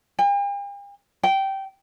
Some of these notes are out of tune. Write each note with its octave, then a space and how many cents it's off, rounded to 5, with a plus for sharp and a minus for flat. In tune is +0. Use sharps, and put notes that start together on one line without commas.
G5 +45
G5 -15